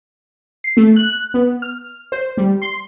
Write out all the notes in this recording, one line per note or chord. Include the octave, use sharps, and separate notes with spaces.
C7
A3
F#6
B3
F6
C5
G3
C6